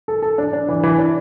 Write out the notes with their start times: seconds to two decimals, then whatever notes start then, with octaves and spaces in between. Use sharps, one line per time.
0.08 A4
0.22 A4
0.38 D4
0.53 D4
0.68 E3
0.83 E3
0.99 D4